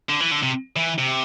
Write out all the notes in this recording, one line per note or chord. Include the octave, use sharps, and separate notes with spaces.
D3
E3
D3
C3
E3
C3